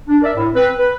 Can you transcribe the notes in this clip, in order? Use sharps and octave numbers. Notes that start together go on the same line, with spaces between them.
D4
A#4 D5 E5
A2
C4 B4
B4